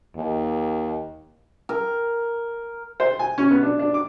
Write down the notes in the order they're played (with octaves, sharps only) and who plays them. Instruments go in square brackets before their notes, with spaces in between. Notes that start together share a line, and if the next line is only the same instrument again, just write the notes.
[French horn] D#2
[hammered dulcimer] A#4
[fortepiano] C5
G#5
C#4
B3
D4
D4
D6